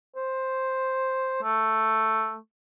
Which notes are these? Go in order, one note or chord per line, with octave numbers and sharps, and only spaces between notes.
C5
A3